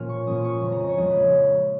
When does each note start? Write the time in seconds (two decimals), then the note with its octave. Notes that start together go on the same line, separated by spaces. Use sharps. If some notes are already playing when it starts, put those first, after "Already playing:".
Already playing: A#2 F3 A#3 C#4 F6
0.09 C#6
0.26 A#2 F3 A#3 C#4 D#6
0.44 C#6
0.62 F2 C#3 F3 G#3
0.72 A#5
0.80 D#5
0.88 C#5
0.98 F2 C#3 F3 G#3 D#5
1.10 B4